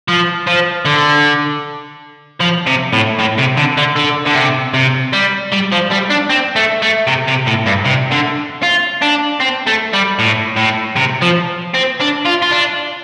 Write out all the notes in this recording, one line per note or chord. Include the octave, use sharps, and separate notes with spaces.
F3
F3
D3
F3
C3
A2
A2
C3
D3
D3
D3
D3
C3
C3
G3
G3
F3
G3
D4
C4
A3
A3
C3
C3
A2
G2
C3
D3
F4
D4
C4
A3
G3
A2
A2
C3
F3
C4
D4
F4
F4
D4